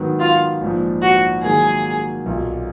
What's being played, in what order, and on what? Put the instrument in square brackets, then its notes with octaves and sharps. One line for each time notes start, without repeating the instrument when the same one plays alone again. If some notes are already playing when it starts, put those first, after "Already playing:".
Already playing: [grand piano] G#2 D#3 F#3 B3
[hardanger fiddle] F4
[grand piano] A#1 G#2 F3
[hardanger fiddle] F#4
[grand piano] G#2 D#3 F#3 A#3 [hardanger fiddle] G#4
[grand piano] B1 A#2 F#3